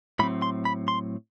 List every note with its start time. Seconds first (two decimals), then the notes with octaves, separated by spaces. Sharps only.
0.19 A2 F#3 C4 B5
0.42 C6
0.65 B5
0.88 C6